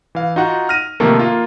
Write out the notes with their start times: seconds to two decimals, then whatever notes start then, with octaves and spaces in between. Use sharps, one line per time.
0.15 E3 F5
0.36 D#4 F4 F#4 F#5
0.69 F6 A#6 D#7
1.00 C3 D#3 F3 A3 A#3
1.19 A#3 F4